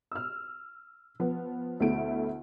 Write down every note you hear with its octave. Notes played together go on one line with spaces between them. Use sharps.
E6 F6
F3 B3
D2 B2 A3 E4 D7